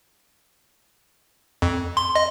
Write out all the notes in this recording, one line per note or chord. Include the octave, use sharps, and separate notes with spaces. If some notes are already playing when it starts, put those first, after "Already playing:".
F2
C6
D#5